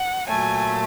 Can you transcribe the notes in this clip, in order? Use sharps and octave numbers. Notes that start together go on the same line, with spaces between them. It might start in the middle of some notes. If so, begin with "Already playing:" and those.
Already playing: F#5
A#2 F#3 A3 G#5